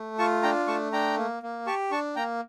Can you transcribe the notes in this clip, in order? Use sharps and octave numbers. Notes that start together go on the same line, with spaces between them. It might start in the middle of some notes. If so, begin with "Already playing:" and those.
Already playing: A3
F4 A5 C#6
D4 G5 A#5
A3 A5 C#6
D4 G5 A#5
A#3
A#3
G4 A5 C#6
D4 A5 C#6
A#3 G5 A#5